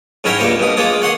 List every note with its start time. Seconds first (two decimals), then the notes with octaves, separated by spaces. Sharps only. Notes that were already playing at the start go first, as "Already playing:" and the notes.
0.24 G#2 C#4 E4 A#4 C#5 G5
0.39 C#2 G2 A#3 C5 C#5
0.59 G2 B2 D#6
0.77 G#3 A#3 F4 C#5 D#6
1.02 C#5 F#5 C6 D#6